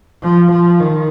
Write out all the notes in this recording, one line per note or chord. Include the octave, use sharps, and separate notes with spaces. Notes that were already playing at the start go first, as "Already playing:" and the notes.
F3
F3
D#3